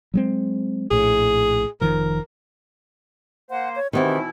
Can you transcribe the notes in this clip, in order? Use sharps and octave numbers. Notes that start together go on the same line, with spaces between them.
F#3 G#3 C4
A#1 A2 G#4
F1 D#3 F3 A#4
A#3 C5 F#5
C#5
B2 D#3 E3 B3 C4 E4 G4